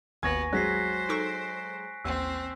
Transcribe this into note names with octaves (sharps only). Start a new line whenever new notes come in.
G#1 D#2 B3 G#5 C#6 G#6 A#6
F#3 G#3 C5 F#6 B6 C7
D#4 A4 C#6 D7
A1 D#2 C4 E6